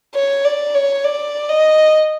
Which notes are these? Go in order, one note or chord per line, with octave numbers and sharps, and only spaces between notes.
C#5
D5
C#5
D5
D#5